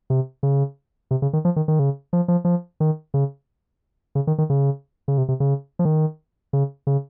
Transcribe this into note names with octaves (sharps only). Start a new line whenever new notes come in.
C3
C#3
C3
C#3
D#3
F3
D#3
D#3
C#3
F3
F3
F3
D#3
C#3
C#3
D#3
D#3
C#3
C#3
C3
C3
C#3
F3
D#3
C#3
C#3